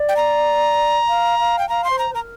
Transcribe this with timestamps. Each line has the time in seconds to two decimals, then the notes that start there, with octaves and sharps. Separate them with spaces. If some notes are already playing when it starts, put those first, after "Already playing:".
Already playing: D5
0.09 G5
0.16 A#5
1.07 F5
1.38 F5
1.59 G5
1.69 F5 A#5
1.84 C6
1.89 C5
1.99 A#5
2.09 C5
2.14 A#4 A#5